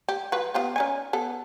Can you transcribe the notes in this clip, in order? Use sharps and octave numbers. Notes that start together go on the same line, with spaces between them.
G4
F3 F#4 B4
B3 F4 G4
C#4 D#4 G#5
B3 A4